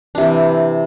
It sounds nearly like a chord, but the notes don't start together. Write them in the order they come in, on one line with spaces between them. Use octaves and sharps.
D4 C3 E3